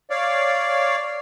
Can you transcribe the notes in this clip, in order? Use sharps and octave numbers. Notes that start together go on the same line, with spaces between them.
C#5 D5 F5